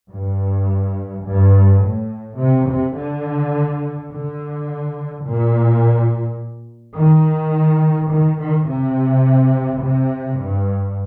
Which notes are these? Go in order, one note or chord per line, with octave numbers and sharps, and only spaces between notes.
G2
G2
A2
C3
C3
D3
D3
A#2
D#3
D#3
D#3
C3
C3
G2